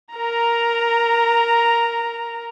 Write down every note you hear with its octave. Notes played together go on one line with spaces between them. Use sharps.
A#4 A#5